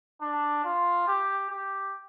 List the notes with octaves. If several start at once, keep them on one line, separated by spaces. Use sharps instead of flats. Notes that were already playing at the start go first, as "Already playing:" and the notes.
D4
F4
G4
G4